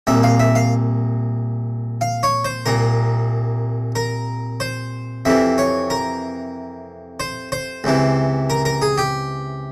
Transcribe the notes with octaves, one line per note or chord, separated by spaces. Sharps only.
C2 A#2 E5
F5
E5
F5
F5
C#5
C5
C2 A#2 A#4
A#4
C5
F2 C3 E3 E5
C#5
A#4
C5
C5
C#2 C3 E3
A#4
A#4
G#4
G4